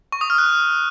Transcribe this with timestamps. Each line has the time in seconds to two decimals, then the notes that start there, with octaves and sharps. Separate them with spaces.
0.12 C#6
0.21 D#6
0.30 F6
0.38 F#6